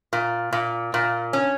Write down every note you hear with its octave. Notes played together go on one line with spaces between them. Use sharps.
A#2
A#2
A#2
C#4